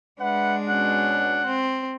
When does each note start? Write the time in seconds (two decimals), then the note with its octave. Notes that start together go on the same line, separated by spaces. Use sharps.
0.20 G#3 D4 B4 E5 F#5
0.68 B2 C#4 F#5
1.47 C4